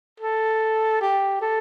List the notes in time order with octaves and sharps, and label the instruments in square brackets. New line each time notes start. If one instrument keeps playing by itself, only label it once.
[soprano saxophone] A4
G4
A4